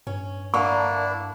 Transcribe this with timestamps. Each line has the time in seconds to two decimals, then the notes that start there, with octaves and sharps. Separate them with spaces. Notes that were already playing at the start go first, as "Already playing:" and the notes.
0.07 G2 C#4
0.54 D3 A#3 D4 E4 A#4 C#6